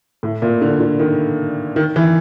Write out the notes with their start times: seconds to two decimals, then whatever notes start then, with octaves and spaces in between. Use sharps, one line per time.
0.23 A2
0.42 A#2
0.62 D3
0.80 D3
0.99 D#3
1.76 D#3
1.96 E3